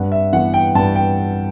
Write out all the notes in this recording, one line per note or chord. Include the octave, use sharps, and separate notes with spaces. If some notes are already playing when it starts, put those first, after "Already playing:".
Already playing: G2 F#5
E5
E3 B3 F#5
G5
G2 A5
G5